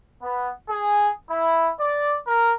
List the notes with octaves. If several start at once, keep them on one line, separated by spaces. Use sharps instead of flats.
B3
G#4
E4
D5
A#4